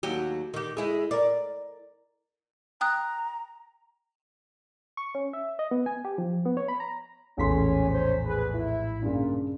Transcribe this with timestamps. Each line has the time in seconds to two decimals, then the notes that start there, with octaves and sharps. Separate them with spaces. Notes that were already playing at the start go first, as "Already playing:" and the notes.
0.03 D#2 F#3 G4
0.54 D#3 G4
0.77 G#3 E4 G#4
1.11 A#4 D5
2.81 G5 A#5 D#6 F#6
4.97 C#6
5.15 C#4
5.33 E5
5.59 D#5
5.71 B3
5.86 G#5
6.05 G4
6.18 F3
6.45 B3
6.57 C#5
6.68 B5
6.80 A#5
7.38 A#1 E2 A2 C#4 A4 C6 B6
7.89 C#4 C5
8.24 G#4 B4
8.54 E4
9.03 G2 A#2 C#3